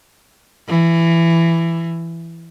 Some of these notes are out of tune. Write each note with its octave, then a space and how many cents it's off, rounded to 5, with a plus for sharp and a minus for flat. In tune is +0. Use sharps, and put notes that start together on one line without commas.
E3 +15